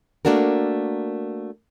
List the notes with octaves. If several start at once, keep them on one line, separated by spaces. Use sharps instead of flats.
A3 A#3 D4 F#4 A#4